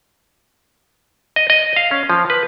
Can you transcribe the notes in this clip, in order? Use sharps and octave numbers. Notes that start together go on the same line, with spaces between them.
D#5
D#5
F5
C#4
F3
B4